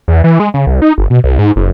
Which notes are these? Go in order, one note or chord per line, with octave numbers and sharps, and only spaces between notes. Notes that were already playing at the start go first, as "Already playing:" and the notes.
E2
E3
G#3
C#3
C2
D#4
G1
B2
C2
G#2
F#1